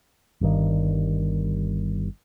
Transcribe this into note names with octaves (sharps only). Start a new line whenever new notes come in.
G1 G2 D#3